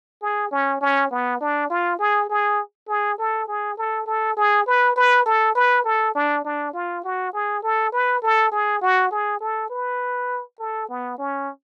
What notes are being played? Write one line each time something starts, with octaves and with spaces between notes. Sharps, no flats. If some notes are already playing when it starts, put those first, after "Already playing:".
G#4
C#4
C#4
B3
D4
F4
G#4
G#4
G#4
A4
G#4
A4
A4
G#4
B4
B4
A4
B4
A4
D4
D4
F4
F#4
G#4
A4
B4
A4
G#4
F#4
G#4
A4
B4
A4
B3
C#4